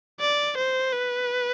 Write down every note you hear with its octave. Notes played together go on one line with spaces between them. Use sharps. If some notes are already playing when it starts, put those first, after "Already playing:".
D5
C5
B4